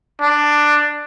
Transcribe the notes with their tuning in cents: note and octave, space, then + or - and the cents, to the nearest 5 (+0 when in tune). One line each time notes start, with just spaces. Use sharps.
D4 +10